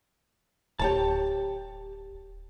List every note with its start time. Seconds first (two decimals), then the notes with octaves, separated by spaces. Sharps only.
0.79 D1 G4 C#5 A5